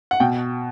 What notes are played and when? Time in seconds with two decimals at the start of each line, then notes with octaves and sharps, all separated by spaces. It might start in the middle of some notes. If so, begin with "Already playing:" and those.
0.11 F#5
0.20 B2 G5